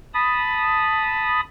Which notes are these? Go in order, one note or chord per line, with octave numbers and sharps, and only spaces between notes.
A5 B5 D#6